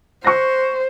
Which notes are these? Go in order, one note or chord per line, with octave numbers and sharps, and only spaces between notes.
C5 C#6 F#6 A#6